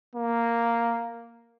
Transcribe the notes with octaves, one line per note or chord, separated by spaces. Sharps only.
A#3